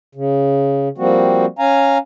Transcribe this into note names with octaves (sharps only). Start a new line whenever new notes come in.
C#3
F3 G3 A#3 C4 F#4
C#4 F5 G#5 A#5